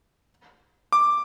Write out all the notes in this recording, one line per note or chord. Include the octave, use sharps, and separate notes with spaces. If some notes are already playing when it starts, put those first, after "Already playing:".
D6